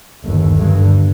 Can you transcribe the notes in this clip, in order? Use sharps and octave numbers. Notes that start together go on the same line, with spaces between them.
G1 D#2
G2 D3